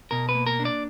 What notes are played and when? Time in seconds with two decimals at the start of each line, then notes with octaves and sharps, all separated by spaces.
0.11 B2 A#4
0.29 B4
0.35 A#3
0.47 A#4
0.59 D4
0.65 D5